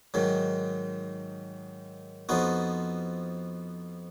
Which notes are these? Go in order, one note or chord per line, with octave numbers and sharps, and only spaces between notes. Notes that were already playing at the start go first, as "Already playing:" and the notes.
G#2 D#3 F#3
F2 F3 B3 D#4 F#4